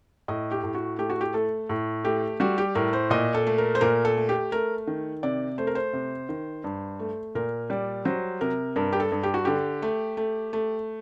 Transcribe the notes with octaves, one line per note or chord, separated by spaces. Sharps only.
A2 D#5
G4
A2
F#4
A3 G4
F#4
G4
A3 A4
A2
A3 G4
G3 F#4
G4
A2 A#4
C5
A#2 D#5
A4
A3
A#4
C5
A#2 A#4
A4
A3
G4
A3 A#4
D#3
C3 D5
A3 C5
A#4
C5
C3
D#3
G2
A3
A#2 A#4
G3 D5
F#3 C5
C3 A#4
G2 A#4
G4
A4
G2
G4
F#4
D3 G4
A3
A3
A3